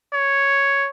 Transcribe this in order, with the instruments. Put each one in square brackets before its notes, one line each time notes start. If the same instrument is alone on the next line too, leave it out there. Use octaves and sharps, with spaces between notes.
[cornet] C#5